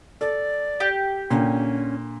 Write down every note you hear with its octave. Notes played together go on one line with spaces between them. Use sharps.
A4 D5
G4
A#2 D3 C#4